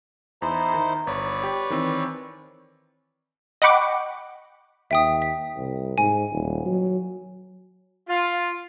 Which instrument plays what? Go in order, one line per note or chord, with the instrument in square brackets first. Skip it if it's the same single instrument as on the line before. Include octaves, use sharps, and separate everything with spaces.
[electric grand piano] E2 [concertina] D#4 E4 C5
[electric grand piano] D#3
[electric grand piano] G1 [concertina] B4 C#5 D5
[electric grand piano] G4
D#3 E3 C4
[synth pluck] D#5 F#5 G5 B5 C#6 D6
[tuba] D#2 [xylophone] E5 G5 D#6
[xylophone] B6
[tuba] C2
[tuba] G#2 [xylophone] G#5
[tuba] D#1
F#3
[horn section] F4